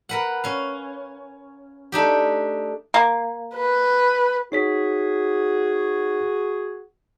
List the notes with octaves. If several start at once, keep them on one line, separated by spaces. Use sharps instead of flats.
A#4 B4 F#5
C#4 F5
A3 D4 D#4 G4
A#3
B4
D#4 F#4 G#4 C#5 B6